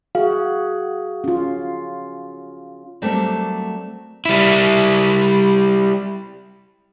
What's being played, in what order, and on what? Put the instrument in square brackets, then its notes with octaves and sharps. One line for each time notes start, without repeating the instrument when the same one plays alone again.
[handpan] F#4 G#4 [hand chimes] F5
[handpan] C#4 F4
[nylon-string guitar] F#3 G3 A3 A#3 C4 G4
[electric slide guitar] G3 E4